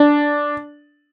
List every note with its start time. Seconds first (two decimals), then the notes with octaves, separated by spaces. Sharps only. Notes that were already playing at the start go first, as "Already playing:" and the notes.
Already playing: D4